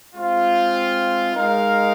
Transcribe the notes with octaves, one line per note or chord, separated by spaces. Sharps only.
G#3 C4 F4
G#3 D#4 A#4 F5